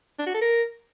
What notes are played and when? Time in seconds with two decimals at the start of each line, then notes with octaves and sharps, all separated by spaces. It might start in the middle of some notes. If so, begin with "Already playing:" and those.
0.19 D4
0.27 F#4
0.34 A4
0.42 A#4